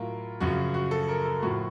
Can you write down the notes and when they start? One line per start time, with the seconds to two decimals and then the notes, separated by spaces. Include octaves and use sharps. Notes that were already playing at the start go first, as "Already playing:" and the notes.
Already playing: A2 F#3 F4 A#4
0.40 F#2 C#3 F3 F#4
0.74 F#4
0.91 A4
1.09 A#4
1.25 A4
1.42 A2 F3 F#4